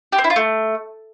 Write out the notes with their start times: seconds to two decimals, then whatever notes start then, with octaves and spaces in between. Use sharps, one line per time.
0.12 G4
0.18 C4
0.24 E4
0.30 F4
0.36 A3